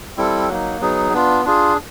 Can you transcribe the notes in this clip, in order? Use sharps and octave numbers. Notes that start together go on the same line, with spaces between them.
G3 C4 E4 A4
F#3 A#3 D#4
F#3 B3 D#4 G#4
B3 D4 F4
D4 F4 G#4